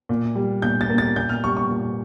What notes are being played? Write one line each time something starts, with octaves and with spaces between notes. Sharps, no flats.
A#2
G3
A#2 G6
A6
A#3
A6
A#2 G6
F6
G3 C#6
C#6
A#2